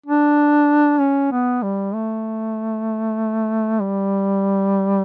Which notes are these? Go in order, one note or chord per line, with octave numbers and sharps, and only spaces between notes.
D4
C#4
B3
G3
A3
G3